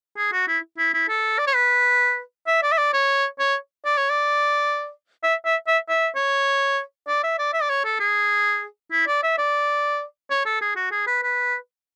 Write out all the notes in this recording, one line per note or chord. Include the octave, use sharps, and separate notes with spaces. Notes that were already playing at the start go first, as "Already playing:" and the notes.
G#4
F#4
E4
E4
E4
A4
D5
C#5
B4
E5
D5
E5
D5
C#5
C#5
D5
C#5
D5
E5
E5
E5
E5
C#5
D5
E5
D5
E5
D5
C#5
A4
G#4
E4
D5
E5
D5
C#5
A4
G#4
F#4
G#4
B4
B4